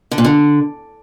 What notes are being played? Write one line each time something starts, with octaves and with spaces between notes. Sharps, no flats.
D3
A#2
D3